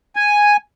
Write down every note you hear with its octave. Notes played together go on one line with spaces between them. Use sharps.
G#5